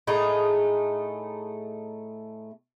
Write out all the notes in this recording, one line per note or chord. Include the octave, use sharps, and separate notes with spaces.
A2 A3 D#4 G#4